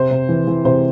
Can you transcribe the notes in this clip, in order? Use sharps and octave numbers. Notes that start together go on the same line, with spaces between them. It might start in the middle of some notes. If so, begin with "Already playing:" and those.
Already playing: C3 C5
C3
E3
E3
C3 C5